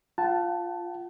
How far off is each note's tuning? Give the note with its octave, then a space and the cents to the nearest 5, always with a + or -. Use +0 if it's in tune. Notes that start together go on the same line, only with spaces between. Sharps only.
F4 +0 F#5 +35 A5 +0